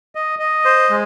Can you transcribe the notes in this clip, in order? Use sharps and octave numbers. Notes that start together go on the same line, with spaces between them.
D#5
D#5
C5
G#3